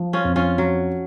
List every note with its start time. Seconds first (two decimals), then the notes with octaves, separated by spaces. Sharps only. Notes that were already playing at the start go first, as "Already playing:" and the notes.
Already playing: F3
0.13 C#4 F4
0.24 F2
0.36 C#4 F4
0.58 F3 F#3